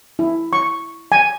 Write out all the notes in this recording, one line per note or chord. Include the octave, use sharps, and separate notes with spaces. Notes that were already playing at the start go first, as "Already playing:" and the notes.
E4
C#6
G#5